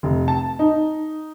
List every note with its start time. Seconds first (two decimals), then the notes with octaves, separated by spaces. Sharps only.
0.03 F1
0.28 A5
0.59 D#4